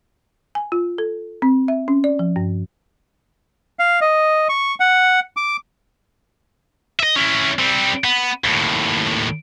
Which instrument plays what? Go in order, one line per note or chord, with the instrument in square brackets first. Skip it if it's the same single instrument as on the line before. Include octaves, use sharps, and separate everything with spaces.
[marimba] G#5
F4
A4
C4
E5
C#4
D5
F3
G2
[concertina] F5
D#5
C#6
F#5
D6
[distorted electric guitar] D#5 E5
C#4 E4
G3 C4
B3
D#2 A2